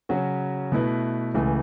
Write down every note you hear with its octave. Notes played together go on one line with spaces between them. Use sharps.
C#3 F#3 C#4 F#4
B2 A3 E4 B4
C#2 C#3 E3 A3